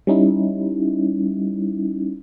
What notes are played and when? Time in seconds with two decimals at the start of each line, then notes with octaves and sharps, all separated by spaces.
0.07 G3 C#4 D#4 E4